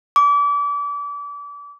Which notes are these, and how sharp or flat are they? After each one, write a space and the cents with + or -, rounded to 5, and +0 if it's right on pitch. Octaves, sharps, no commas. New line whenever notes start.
D6 -35